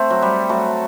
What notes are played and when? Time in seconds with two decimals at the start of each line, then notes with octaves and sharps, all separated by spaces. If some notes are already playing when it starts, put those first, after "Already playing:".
Already playing: A3 C4
0.10 F#3
0.22 G3
0.49 F#3 A3